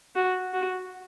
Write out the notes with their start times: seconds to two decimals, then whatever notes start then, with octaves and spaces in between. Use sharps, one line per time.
0.16 F#4
0.54 F#4